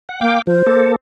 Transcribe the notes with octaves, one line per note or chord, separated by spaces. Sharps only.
F#5
A#3 F5 G5 D6
F3 C5
A#3 A4